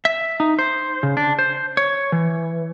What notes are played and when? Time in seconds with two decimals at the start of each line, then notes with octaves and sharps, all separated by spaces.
0.05 E5
0.40 D#4
0.59 C5
1.03 C#3
1.17 D4
1.39 C5
1.77 C#5
2.12 E3